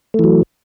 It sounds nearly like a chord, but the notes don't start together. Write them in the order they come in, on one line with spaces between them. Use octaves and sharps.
A3 E3 F#3